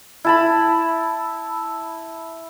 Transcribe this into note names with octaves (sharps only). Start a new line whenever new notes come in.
E4 A5 B5